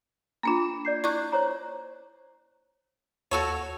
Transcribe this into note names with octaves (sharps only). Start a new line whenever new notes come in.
A#3 D4 F4 A#5
D5 G6 C7
E4 D5 C#6 D6 F#6
C5 C#5 A#5
D#2 F#4 A4 C#5